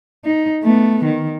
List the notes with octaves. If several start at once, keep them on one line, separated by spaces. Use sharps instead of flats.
D#4
A3 B3
D#3